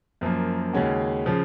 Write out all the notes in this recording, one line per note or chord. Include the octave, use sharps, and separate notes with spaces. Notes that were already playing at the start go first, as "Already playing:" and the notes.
F#2 F3 A#3
D#2 C#3 G#3 C#4 F#4
C#3 F3